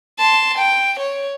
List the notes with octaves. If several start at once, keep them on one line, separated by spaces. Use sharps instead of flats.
A5 C6
G5
C#5